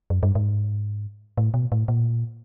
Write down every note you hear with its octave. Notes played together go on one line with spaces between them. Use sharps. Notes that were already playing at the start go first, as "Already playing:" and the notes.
F#2
G2
G#2
A2
B2
A2
A#2